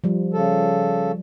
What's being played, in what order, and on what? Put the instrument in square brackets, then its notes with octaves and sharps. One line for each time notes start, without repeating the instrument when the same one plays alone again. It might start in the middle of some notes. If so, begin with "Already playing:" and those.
[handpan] F3 G3
[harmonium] C#3 A4